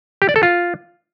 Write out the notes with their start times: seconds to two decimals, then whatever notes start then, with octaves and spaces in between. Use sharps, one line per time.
0.22 G4
0.29 D5
0.36 A4
0.43 F4